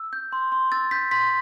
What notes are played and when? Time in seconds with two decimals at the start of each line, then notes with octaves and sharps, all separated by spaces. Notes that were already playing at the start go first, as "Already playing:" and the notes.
Already playing: E6
0.13 G6
0.33 C6
0.52 C6
0.72 E6 A6
0.91 G6 B6
1.11 C6 B6